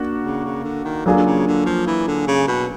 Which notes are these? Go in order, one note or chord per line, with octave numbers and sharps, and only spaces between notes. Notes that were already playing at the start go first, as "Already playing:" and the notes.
Already playing: A#3 D4 F#4
C#3
C#3
D3
D#3
D3 F#3 A#3 D4 F4 G#4
D3
C#3
D3
F3
E3
D3
C#3
B2